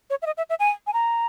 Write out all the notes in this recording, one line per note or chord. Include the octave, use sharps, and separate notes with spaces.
C#5
E5
D#5
E5
E5
G#5
G#5
A#5